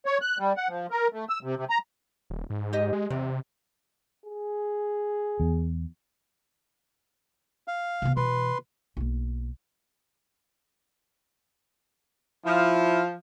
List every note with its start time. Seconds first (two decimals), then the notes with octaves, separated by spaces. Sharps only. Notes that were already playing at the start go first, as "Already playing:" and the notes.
0.06 C#5
0.22 F#6
0.39 G3
0.57 F#5
0.69 F3
0.91 A#4
1.13 A3
1.29 E6
1.43 C3
1.56 C3
1.70 A#5
2.30 D#1
2.50 G#2
2.73 G4 D#5
2.93 G#3
3.10 E2 C3
4.26 G#4
5.40 E2
7.68 F5
8.02 C3 B3
8.17 B2 E3 B4 C6
8.97 B1 A#3
12.46 F3 E4